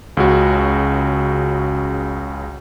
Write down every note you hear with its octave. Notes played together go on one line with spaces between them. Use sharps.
C#2 C#3 F#4